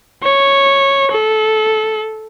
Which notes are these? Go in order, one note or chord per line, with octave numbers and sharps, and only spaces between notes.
C#5
A4